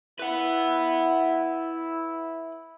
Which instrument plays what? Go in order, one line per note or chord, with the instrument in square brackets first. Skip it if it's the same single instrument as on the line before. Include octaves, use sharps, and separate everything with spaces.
[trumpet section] E4 [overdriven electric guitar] B4 F#5